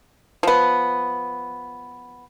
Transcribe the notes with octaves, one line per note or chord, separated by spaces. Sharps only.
F3 B3